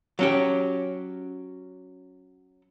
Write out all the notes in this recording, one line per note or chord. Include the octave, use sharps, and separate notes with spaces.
F#3 C#4 G4